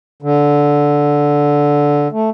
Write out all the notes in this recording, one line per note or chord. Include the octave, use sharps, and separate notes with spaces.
D3
A3